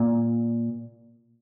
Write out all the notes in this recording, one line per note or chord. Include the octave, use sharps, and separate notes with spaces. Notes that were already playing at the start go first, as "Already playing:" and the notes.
Already playing: A#2